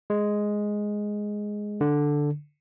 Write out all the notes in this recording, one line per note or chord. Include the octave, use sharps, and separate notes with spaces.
G#3
D3